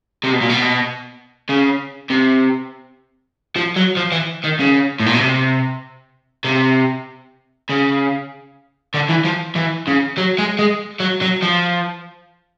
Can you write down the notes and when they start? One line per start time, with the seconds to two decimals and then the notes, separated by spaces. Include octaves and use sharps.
0.24 C3
0.33 B2
0.42 A#2
0.50 B2
1.49 C#3
2.10 C3
3.56 F3
3.76 F#3
3.97 F3
4.12 E3
4.44 D#3
4.59 C#3
5.00 A2
5.06 A#2
5.15 B2
5.21 C3
6.45 C3
7.69 C#3
8.94 D3
9.09 E3
9.24 F3
9.55 E3
9.87 C#3
10.18 F#3
10.38 G#3
10.59 G#3
11.00 F#3
11.21 F#3
11.42 F3